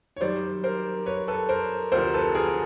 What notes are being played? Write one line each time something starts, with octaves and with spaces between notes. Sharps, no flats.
C#5
F#2 D#3 G3 C5 D5
A#4 C5
B4 C#5
A4 B4
A#4 C5
D2 C3 F3 A#4 C5
A4 B4
G#4 A#4